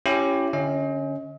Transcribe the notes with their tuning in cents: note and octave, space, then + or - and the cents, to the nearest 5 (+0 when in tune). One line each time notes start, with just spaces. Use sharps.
C#4 +0 E4 +35 G4 +0
D3 -10 C#4 +0 D#5 +40